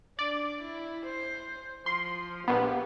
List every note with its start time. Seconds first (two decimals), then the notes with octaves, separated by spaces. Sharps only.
0.19 D4 D5
0.62 E4
1.06 C5
1.86 F3 C6
2.48 A#1 B3 G4